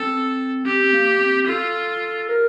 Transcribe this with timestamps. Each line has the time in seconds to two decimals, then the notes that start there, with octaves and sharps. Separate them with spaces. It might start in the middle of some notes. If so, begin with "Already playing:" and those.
Already playing: C4 A4
0.66 C4 G4
0.82 C4
0.93 A#3
1.20 C4
1.47 F4 A4
2.29 A#4